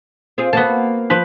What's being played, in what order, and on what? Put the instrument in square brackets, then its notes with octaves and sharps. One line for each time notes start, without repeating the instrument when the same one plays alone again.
[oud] C4 F4 G#4
[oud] A#3 F#4 [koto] B3 A5
[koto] F3 B4